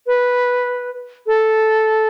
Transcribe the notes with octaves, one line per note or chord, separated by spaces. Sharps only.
B4
A4